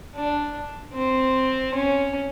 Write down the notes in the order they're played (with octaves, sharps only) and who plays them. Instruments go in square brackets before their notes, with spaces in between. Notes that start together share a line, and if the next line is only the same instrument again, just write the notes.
[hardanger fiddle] D4
C4
C#4